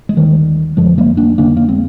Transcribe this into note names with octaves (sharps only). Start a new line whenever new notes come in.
G#3
D#2 D3 D#3 G3
F2 D3 F3 G#3
G3 A#3
A#3 D4
F2 D3 A#3 D4
A#3
G#3 C4